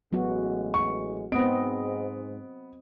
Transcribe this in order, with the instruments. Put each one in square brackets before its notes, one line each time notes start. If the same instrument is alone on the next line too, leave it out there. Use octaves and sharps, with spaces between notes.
[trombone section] A1 G#3 [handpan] F#3 B3 F#4
[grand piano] C#6
[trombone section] G#2 [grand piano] B3 D7 [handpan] C4 D#5